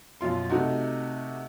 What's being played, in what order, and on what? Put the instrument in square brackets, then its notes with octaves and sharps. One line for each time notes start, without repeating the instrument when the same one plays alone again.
[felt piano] F#2 B2 F4 C6
C3 A3 D#4 F#4